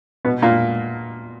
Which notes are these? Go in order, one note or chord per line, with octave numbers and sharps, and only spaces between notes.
B2 B3
A#2 A#3